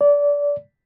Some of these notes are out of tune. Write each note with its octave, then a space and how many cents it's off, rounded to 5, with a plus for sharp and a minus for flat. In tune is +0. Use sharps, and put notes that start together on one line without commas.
D5 -25